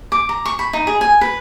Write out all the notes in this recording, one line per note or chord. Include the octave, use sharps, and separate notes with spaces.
D6
A#5
C#6
B5
D#4
G#4
G#5
B4